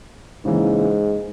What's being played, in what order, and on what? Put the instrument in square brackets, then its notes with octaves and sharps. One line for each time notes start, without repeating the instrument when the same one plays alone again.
[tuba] G#2 [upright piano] C#3 E3 A#3